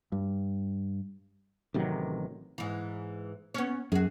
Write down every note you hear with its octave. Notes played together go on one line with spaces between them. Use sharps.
G2
A1 C3 D#3 F#3
G#2 E3
B3 C#4
F#2 F#4 G#4